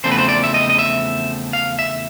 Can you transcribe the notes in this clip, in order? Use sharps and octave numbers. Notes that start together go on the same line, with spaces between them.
E2 C#3 F3 A3 C4 C5
B4
C5
D5
E5
D#5
D#5
E5
F5
E5